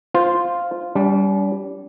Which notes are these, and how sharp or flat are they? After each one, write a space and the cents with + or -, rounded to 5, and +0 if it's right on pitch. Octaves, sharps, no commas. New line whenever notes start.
F4 +0 C5 +0
G3 +0 D4 -45